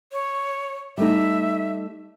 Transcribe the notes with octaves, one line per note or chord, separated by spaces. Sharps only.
C#5
G3 A3 D#4 E5